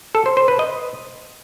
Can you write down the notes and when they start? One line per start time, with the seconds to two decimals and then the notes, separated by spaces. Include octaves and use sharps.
0.15 A4
0.26 C5
0.37 C5
0.48 B4
0.59 D#5